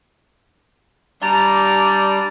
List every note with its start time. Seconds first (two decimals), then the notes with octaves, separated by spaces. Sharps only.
1.22 G3 D4 D5 A#5